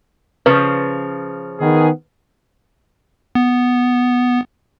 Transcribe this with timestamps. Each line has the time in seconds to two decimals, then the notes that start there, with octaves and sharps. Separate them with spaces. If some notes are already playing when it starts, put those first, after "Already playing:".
0.46 C#3 F3 B4
1.60 D#3 B3 G#4
3.35 B3